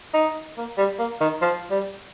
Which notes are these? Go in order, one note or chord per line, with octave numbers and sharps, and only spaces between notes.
D#4
A#3
G3
A#3
D#3
F3
G3